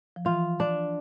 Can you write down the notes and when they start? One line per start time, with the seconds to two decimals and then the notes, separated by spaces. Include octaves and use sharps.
0.16 F3
0.25 E3 F4
0.60 D4